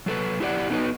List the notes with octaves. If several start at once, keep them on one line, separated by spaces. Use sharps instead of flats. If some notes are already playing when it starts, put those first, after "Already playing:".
F#3 A4 B4
E4 G4 A#4 D5 F#5
A3 B3 D#4 F#4 B4 D#5